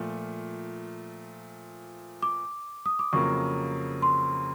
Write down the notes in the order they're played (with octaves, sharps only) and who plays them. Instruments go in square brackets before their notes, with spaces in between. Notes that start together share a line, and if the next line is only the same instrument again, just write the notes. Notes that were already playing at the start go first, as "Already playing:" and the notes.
Already playing: [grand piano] A#2 F3 A3
[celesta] D6
D#6
D6
[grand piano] F2 C#3 F#3 A#3 [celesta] C#6
[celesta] C6